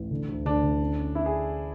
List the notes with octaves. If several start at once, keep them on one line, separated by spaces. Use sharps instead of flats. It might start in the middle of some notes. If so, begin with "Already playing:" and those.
Already playing: A1
D3
D2
D2 D4
D3
C#4
C#4
C#4 E4
G#4